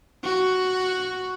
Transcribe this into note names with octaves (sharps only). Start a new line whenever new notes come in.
F#4